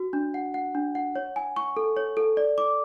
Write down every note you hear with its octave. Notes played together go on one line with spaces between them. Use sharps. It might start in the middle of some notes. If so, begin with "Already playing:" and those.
Already playing: F#4
D4
F#5
F#5
D4
F#5
C#5
G#5
C#6
A4
C#5
A4
D5
D6